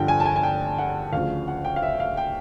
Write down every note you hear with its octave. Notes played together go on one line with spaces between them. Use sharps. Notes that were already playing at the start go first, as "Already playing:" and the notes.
Already playing: G2 D3 F3 G5
G#5
A5
G#5
G#5
G5
F#5
D2 C#3 F3 F5
F#5
G5
F5
E5
F5
G5